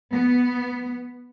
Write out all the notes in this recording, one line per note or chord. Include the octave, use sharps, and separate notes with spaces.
B3